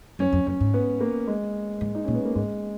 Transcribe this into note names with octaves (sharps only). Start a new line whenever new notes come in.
F#2 C#4
F2
F#2 C#4
G#2
B3
A#3
G#3
G#2
D#4
A#2 C#4
B3
A#3
G#2 G#3